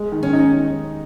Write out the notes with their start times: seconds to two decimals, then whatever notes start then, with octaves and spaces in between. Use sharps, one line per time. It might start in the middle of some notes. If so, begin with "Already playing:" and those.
Already playing: G#3
0.12 D#3
0.23 C#4
0.33 D#4